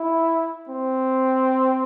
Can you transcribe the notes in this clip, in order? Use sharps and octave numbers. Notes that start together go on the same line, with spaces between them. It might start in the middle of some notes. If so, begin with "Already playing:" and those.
Already playing: E4
C4